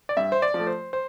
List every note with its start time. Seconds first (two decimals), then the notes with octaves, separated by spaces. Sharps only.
0.09 D5
0.17 G2 E5
0.32 C5
0.42 D5
0.54 F3
0.59 A3
0.67 C5
0.93 C5